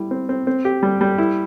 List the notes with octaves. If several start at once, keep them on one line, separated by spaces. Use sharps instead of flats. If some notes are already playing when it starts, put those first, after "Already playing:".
Already playing: G3 E4
C4
C4
C4
G4
G3
G3
E4